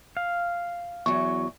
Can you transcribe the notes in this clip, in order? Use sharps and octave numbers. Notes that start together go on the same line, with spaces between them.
F5
E2 F#3 C#6